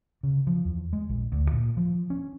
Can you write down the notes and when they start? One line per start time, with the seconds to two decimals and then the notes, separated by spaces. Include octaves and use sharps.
0.23 C#3
0.47 F3
0.65 E2
0.93 G#3
1.09 A#1
1.32 D2
1.52 A#2
1.77 F3
2.10 C#4